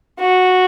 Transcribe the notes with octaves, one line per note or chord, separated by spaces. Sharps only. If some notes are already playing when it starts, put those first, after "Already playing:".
F#4